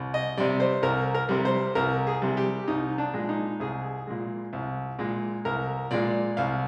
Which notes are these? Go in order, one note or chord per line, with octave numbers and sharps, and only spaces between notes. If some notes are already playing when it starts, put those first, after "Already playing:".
Already playing: C2
D#5
C3 G3 D5
C5
C2 A#4
A#4
C3 G3
C5
C2 A#4
G#4
C3 G3
G4
C2 D#4
D4
A#2 G#3
D#4
C2 G#4
A#2 G#3
C2
A#2 G#3
C2 A#4
A#2 G#3 D5
C2 F5